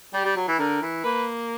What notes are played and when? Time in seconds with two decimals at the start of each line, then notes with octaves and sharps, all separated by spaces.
0.13 G3 G4
0.25 G3
0.36 F#3
0.48 E3
0.59 D3 A#4
0.82 E3
1.04 A#3 B4